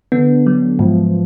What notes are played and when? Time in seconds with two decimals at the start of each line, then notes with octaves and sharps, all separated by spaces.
0.12 D3 B3
0.47 F#3
0.79 G#2 F3